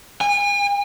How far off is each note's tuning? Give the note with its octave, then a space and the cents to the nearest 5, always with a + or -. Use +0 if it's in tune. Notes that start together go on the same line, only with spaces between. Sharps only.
G#5 -40